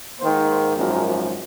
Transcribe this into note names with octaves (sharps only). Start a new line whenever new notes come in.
G#2 D#3 A#3 C5
C5
G#1 F#2 F3 A#4